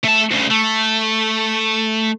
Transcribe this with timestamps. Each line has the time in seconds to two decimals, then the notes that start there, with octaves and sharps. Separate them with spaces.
0.04 A3 A5
0.31 D2 C#3
0.50 A3